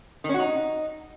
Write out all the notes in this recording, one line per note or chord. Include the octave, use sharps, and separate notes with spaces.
D#3
C#4
F#4
D#4